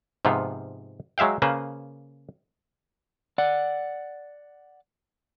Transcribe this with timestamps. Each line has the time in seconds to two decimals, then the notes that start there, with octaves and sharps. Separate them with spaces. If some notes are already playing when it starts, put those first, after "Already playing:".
0.25 G#2 C3 F3 B3 F4
1.18 F#3 G#3 E5 F5 G5
1.42 C#3 A#3 B4 C5
3.38 D5 F#5